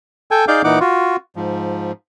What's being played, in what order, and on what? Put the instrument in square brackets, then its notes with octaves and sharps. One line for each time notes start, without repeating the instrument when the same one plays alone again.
[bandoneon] A4 G5 G#5
D#4 G#4 D5 F5 D6 G6
A#2 E3 D#4 F#5 D6
F4 F#4
G#2 F3